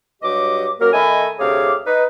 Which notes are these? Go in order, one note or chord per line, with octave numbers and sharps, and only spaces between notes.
G2 F#3 G4 D#5 D6
F#2 F#3 A#3 A#4
D#3 A3 A4 D#5 G#5 B5
D2 C3 G#4 C#5 F5 D6
D#4 B4